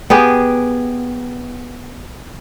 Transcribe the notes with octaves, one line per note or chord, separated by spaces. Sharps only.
B3 G4 G#4